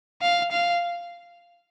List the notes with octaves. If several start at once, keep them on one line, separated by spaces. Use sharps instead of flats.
F5
F5